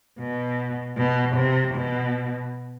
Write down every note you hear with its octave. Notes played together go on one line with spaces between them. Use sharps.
B2
B2
C3
B2